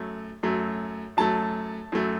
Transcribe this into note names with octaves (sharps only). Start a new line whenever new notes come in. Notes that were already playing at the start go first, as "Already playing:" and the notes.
Already playing: F#2 F#3 A3
F#2 F#3 A3
F#2 F#3 A3 A5
F#2 F#3 A3